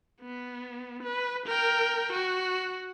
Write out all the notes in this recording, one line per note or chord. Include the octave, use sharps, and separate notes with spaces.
B3
B4
A#4 G5
F#4